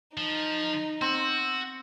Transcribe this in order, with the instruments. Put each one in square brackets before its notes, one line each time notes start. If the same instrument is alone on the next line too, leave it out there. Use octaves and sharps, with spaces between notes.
[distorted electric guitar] F3 [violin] D#4
[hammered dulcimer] C4 [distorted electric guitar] F#4